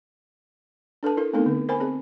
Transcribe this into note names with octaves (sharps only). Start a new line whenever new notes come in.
D4 A4 B4 A5
E4 A4 A#4
A3 B3 C4 D#4 A4 A#4
D3
A#4 C5 G#5 B5
C4 G#4